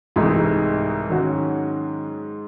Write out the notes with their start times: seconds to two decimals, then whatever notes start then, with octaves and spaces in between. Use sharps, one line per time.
0.16 C2 G#2 C3 E3 G#3 A3 D#4
1.09 D#3 F#3 C#4 F#4